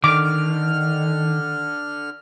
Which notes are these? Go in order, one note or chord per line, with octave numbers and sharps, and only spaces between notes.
D3 D#3 D6 F6